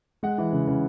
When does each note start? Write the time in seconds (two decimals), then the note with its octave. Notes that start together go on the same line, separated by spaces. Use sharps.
0.23 G#3 F#5
0.38 E3
0.52 C#3
0.67 C#3